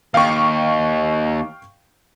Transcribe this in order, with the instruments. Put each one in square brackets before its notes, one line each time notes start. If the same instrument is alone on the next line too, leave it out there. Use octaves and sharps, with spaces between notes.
[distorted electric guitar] D#2 [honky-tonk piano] F5 G5 C#6